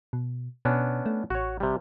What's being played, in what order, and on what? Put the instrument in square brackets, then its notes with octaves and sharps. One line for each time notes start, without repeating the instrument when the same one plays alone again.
[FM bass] B2
[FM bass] B2 [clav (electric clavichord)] B3 C#4 D4
[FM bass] A3
[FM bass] A1 [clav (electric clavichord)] F#4 C#5
[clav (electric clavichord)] C3 G3